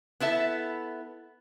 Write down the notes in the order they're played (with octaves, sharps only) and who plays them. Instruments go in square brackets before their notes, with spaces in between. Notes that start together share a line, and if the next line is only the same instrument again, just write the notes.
[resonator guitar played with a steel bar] B3 E4 A4 E5